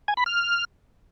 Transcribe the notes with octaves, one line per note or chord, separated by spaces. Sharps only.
G#5
B5
F6